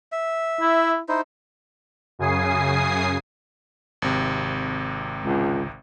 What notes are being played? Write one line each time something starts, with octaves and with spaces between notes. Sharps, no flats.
E5
E4
D#4 E4 C5
F#2 C#3 G#5 D#6 C7
G#1 C3
C#2